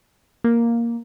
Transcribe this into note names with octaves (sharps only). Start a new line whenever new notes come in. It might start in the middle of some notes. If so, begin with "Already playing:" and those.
A#3